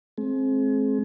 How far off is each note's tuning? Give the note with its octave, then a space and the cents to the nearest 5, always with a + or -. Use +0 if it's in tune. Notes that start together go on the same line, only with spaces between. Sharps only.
G#3 +40 C4 +20 G#4 +35